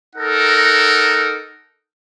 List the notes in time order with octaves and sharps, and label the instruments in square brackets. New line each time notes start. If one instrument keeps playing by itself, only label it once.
[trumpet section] D#4 A4 A#4 F#5